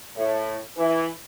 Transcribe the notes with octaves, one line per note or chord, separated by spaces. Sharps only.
A2
E3